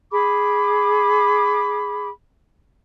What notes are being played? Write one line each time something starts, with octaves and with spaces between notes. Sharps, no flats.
G#4 B5 D6